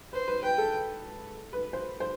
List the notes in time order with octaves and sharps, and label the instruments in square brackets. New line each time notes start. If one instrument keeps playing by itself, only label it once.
[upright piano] B4 [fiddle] C5
[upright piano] B4
[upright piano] B4 [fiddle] G5
[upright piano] A4
B4
C5
C5